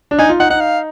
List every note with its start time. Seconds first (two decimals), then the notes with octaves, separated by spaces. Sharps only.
0.11 D4
0.19 D#4 G#5
0.29 F4
0.40 D#4 F#5
0.50 D#4 F#5
0.60 F5